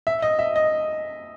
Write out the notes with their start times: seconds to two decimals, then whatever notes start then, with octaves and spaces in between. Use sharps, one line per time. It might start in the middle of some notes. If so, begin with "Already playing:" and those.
0.07 E5
0.22 D#5
0.39 E5
0.56 D#5